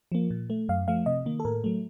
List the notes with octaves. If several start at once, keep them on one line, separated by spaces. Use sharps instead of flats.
F3 A#3
A#2
A3
F#2 F5
F3 A3 F5
C3 D#5
D#3 A#3
A4
A2 A#4
F#3 A3